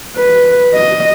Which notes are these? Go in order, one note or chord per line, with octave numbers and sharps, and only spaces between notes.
B4
D#5